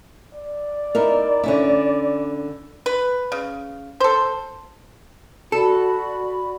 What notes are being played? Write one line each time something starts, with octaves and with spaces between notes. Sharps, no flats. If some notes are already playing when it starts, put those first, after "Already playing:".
D5
D#4 E4 A#4
D3 C#4 E4
B4
C#3
A4 C5
F#4 A4 D5 B5